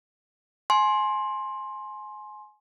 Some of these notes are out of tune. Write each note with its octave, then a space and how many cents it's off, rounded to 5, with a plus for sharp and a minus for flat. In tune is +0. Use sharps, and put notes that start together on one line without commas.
G#5 +25 C6 +15